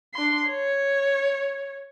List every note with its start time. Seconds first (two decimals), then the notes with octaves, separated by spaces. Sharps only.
0.14 D4 C6
0.48 C#5